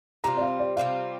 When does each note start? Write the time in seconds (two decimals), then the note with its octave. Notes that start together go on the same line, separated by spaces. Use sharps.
0.24 C3 G3 C4 F4 A#5
0.37 D5
0.41 F5
0.59 D5
0.77 C3 G3 C4 F4 F5